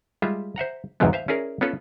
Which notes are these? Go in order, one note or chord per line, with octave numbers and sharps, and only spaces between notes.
G3 G#3 F4 E5
C5 E5 F#5 A#5
E2 G#2 C3 F3 F#3 B3
C5 E5 F5
C#4 E4 G#4 A#4 D5
B3 C#4 F4 A4 B4